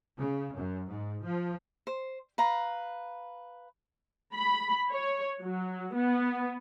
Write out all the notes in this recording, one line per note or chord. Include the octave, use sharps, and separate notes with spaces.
C#3
F#2
G#2
F3
C5
B4 F5 A#5
B5
C#5
F#3
B3